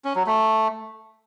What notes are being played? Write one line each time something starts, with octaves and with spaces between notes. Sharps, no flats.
C#4
F#3
A3